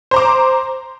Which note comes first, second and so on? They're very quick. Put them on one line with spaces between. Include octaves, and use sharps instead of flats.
C5 A#5 D6